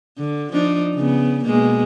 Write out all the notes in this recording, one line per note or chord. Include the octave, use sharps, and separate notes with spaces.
D3
F3 D4 D#4
C#3 B3
B2 G#3 A#3